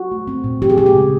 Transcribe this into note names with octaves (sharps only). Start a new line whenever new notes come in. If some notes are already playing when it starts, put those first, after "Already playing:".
Already playing: F#4
A3
C4
A#2
F3 G4
G#4
G#3 G4
G#4
C#3